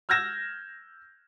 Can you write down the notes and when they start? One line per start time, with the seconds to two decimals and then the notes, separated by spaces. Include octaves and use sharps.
0.09 E6 F6 G6 G#6 A#6 E7